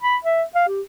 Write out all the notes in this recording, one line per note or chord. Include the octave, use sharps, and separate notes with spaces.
B5
E5
F5
G4